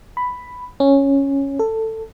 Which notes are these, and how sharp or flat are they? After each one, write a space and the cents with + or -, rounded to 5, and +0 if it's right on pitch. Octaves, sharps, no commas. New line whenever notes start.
B5 +5
C#4 -5
A4 +15